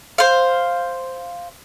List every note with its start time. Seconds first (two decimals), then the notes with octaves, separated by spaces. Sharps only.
0.18 C5 F5